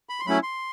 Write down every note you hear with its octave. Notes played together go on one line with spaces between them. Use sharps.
B5
C6
F#3 A3 C#4 E4 B5
C6